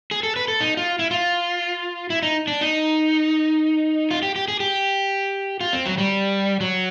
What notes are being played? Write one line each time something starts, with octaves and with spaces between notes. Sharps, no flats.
G#4
A4
B4
A4
D#4
F4
E4
F4
E4
D#4
D4
D#4
F4
G4
G4
G#4
G4
F4
C4
F#3
G3
F#3